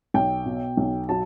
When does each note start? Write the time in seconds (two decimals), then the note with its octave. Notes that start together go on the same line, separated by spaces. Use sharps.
0.14 B1 G5
0.46 B2
0.77 B1
1.09 F#3 A5